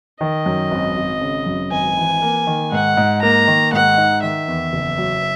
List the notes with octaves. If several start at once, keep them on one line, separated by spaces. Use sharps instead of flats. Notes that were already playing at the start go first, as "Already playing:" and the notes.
D#3 D#5
F#2
G#1
G#1
C#3
F#2
G#1 G#5
E3
A#3
D#3
G#2 F#5
G#2
A#3 A#5
D#3
G#2 F#5
D#4
D#3 E5
E2
F#1
F#3